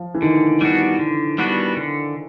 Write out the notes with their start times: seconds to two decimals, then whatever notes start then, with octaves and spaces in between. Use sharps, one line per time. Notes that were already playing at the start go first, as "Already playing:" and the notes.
Already playing: F3
0.15 E3
0.22 D3 D#3
0.61 G3 B3 D4 F#4
0.99 D3
1.38 G3 B3 D4 F#4
1.77 D3